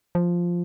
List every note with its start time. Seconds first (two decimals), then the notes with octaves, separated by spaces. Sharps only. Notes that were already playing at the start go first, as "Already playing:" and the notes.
0.15 F3